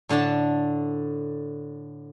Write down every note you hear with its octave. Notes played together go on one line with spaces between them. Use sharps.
A2 D3 D4 A5